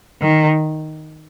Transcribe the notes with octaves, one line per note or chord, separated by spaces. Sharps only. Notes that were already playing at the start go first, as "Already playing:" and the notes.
D#3